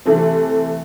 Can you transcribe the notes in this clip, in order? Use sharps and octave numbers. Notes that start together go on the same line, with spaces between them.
C3 E3 A3 C4